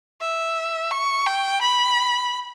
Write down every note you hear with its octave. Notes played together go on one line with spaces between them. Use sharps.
E5
C#6
G5
B5